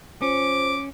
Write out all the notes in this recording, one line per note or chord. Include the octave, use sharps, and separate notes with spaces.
F3 C#4 D6